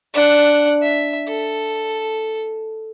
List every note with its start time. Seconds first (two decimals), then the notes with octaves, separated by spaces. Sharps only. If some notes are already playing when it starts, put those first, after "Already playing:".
0.13 D4 F#5
0.82 E5
1.28 A4